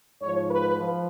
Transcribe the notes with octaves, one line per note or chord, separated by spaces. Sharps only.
G#2 F3 C#5
B4
F3